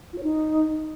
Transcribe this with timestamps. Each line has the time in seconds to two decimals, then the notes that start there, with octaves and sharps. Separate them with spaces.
0.13 F4
0.18 C#5
0.23 D#4